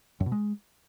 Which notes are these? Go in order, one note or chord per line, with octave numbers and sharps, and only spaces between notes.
F#2
B2
G#3